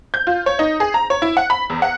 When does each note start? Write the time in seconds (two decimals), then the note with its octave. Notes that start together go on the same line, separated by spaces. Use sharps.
0.14 G6
0.27 F4
0.46 C#5
0.59 D#4
0.80 G#4
0.94 A#5
1.10 C#5
1.22 E4
1.37 F#5
1.50 B5
1.70 E2
1.82 F#5